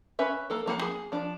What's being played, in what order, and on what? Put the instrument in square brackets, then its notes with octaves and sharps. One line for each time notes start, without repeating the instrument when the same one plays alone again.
[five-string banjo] C#4 B4 E5
A#3 A4 A#4
F3 A#3 G#4 F#5
G#4
F3 D4